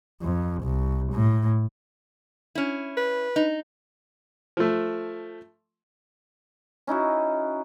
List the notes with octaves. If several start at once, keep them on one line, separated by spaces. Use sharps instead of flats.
F2
C2
A2
C#4 E4
B4
D#4
F3 A3
C#4 D#4 E4 F#4